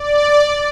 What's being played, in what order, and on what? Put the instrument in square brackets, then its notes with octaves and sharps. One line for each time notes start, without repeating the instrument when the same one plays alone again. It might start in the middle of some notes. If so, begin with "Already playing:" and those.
Already playing: [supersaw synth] D5